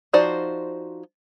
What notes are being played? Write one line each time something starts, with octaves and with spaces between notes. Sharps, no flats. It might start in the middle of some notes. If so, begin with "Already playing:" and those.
F3 D#4 F#4 C5 D5